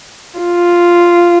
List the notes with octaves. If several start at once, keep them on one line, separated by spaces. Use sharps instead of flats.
F4